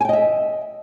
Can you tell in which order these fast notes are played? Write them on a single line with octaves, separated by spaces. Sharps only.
G#5 G5 D#5 E5